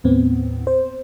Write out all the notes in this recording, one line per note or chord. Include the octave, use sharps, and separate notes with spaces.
D#2 A2 B3 C4
C5